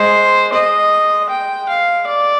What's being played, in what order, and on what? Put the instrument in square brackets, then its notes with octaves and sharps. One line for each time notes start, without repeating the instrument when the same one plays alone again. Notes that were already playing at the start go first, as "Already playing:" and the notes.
Already playing: [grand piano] G#3 [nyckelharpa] C5
[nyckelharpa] D#5
G5
F5
D5